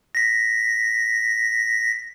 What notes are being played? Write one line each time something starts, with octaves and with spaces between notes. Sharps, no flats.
A#6 B6